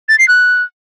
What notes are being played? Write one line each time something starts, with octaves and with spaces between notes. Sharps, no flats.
A6
C7
F#6